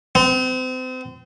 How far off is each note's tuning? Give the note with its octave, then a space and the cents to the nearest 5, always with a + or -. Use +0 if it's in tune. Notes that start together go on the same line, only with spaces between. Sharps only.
C4 -35